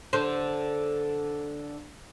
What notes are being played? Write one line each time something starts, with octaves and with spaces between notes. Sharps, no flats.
D3 C5